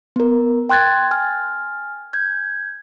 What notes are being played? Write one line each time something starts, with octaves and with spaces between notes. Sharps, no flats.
B3 A#4
G5 C6 F#6 G#6 A6
G#5 F6
G6 G#6